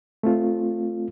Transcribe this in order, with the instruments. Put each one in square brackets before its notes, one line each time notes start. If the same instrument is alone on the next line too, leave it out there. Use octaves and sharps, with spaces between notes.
[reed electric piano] A3 C4 F4